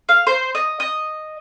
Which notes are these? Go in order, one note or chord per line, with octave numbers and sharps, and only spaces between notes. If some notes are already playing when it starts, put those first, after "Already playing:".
F5
C5
D#5
D#5